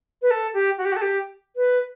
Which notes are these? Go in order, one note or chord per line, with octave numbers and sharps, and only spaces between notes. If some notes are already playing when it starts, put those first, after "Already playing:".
B4
A4
G4
F#4
G4
F#4
A4
G4
B4